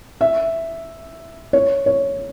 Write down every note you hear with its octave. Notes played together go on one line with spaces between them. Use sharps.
E5
C#5
C#5